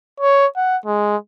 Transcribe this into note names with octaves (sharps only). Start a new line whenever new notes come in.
C#5
F#5
G#3